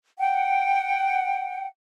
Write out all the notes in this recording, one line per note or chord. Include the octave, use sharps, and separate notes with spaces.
F#5 G5